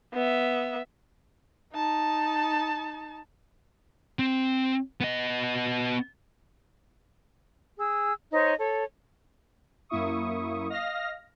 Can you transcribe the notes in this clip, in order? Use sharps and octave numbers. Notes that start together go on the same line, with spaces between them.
B3 E5
D#4 A5
C4
B3 D#5
G#4 E6
D#4 C5 C#5 D#5
A4 C#5
F#2 A#3 E4 E5 C#6 D#6
D#5 F5 F6 A#6